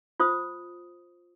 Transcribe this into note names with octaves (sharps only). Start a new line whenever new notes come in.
F4 C5 D#6